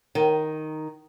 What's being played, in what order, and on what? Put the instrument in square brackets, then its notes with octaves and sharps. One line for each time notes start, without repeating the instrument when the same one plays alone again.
[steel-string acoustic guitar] D#3